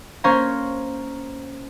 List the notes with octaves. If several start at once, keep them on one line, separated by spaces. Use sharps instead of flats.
A#3 C#4 C5 C#5 F5 A#5